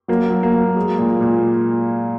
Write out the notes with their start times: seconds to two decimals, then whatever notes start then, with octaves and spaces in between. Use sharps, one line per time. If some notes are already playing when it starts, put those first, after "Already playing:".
0.08 F#3 A#3
0.31 F#3
0.43 A#3
0.54 F#3
0.77 G#3
0.99 A#2
1.21 A#2